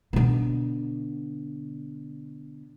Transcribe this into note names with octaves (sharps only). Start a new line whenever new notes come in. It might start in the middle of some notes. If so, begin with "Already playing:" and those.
B2 D3